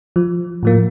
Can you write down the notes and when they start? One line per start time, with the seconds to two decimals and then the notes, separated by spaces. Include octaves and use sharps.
0.16 F3
0.63 A2 F3 A#3